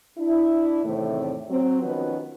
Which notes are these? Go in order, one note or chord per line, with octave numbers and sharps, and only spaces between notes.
D4 E4
E2 A2 C3 D#3 A3 C4
F#3 C4
D#3 F3 B3 C#4 F#4 B4